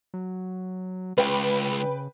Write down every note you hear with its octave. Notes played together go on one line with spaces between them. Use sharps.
F#3
C#2 C#3 B4 G5